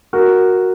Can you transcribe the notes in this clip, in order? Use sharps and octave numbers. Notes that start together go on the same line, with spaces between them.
F#4 A#4